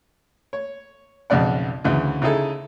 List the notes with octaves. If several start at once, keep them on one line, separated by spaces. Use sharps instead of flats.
C#5
B1 F2 C#3 D5 F#5
D2 C#3 E3
C#3 D#4 E4 G#4 A4